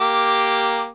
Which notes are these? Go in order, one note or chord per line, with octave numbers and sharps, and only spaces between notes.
A#3 G4 D6